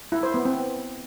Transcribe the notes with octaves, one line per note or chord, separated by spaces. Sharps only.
E4
C5
B3
C4